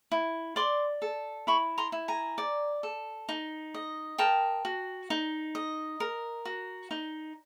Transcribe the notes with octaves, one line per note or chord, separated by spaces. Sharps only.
E4
D5 C6 D6
A4
E4 B5 C#6
A#5 C6
E4
G#5 A#5
D5
A4
D#4
D#5
A#4 G5 A5
F#4
D#4
D#5
A#4
F#4
D#4